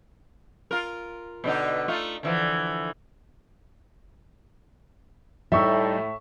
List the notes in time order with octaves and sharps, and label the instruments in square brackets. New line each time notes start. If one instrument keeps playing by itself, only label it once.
[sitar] F4 A#4
B2 D3 D#4
A3 D#4 F4
D3 E3 F3
[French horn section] A2 [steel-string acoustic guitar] G3 D#4 [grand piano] E5 C#6 E6